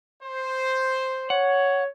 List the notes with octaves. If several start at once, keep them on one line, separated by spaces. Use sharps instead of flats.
C5
C#5 F#5